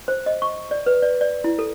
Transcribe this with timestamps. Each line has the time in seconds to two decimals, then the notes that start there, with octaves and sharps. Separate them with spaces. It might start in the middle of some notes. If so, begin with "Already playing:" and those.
0.08 C5
0.26 D#5
0.42 C#6
0.71 D5
0.86 B4
1.02 D5
1.21 D5
1.44 E4
1.59 A4